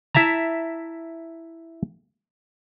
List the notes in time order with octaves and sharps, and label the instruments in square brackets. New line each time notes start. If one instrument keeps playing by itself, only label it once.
[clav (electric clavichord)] E4 E5 A5 A#5